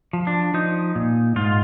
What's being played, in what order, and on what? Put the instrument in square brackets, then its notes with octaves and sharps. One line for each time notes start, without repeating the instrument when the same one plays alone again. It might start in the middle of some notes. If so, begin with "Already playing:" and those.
[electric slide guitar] F3
D4
F3 D#4
A#2
G#2 F4